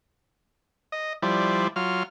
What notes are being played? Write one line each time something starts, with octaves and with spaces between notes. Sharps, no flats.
D#5
F3 G3 E4 C5 D5
F#3 F4 F6